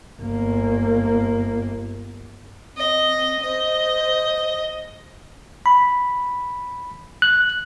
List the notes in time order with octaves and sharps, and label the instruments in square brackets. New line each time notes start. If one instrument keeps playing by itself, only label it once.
[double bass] G1 A#3
[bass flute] C4 [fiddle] D#5
[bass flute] C5 [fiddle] D#5
[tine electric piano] B5
F#6